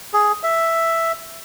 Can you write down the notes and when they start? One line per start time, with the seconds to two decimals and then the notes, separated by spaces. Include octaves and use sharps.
0.14 G#4
0.43 E5